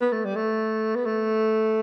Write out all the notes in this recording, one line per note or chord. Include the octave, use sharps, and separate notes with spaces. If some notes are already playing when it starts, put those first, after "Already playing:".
B3
A3
G3
A3
B3
A3